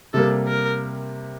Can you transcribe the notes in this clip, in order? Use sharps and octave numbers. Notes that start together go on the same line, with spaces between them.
C3 G3 A#3 A4
A#4